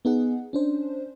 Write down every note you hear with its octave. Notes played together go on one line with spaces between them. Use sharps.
B3 D#4 G#4 F#5
C#4 D4 C5